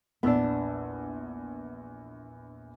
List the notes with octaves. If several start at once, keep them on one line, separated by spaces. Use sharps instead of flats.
A#1 E2 B3 D4 E6